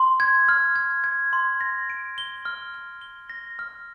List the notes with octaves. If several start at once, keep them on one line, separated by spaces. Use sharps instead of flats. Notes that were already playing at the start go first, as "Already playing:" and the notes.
Already playing: C6
G#6
F6
G#6
G#6
C6
A#6
D7
G7
F6
F6
G7
A#6
F6